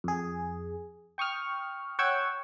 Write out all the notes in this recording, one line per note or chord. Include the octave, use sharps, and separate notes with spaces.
F2 G#4
G5 C#6 D#6 F6
C#5 F#5 G5 C#6 E6 G#6